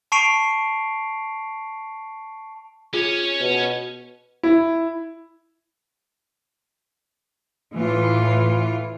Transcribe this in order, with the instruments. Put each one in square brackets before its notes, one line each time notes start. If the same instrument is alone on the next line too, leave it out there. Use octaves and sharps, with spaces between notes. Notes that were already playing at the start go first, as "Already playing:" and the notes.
[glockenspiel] A5 C#6 C7 D7 F7
[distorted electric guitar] C#4 C#5 [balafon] F4 G#4
[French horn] B2
[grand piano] E4
[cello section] A2 E3 F4